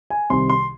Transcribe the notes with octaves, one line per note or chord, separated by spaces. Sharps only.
G#5
C2 C3 D#3 C6
C6